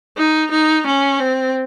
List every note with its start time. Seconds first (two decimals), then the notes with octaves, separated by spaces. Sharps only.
0.17 D#4
0.51 D#4
0.86 C#4
1.20 C4